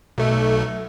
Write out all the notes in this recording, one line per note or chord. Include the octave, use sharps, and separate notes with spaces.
B1 A3